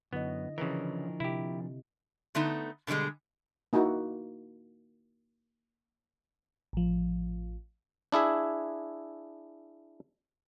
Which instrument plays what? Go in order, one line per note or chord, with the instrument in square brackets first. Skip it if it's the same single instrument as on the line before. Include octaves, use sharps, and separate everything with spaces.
[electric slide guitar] F#2 [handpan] D3 E4 D#5 [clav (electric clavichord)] B3
[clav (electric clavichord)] C#3 E3 [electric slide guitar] F3 D4 A#4 [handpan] E4
[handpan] C3 [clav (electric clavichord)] E4 G4
[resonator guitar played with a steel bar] D3 A3 B3 D#4
B2 D3 E3 G3 G#3
[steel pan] A#3 D#4 E4 F#4
[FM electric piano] A1 F3
[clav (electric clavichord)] D4 E4 G#4 E5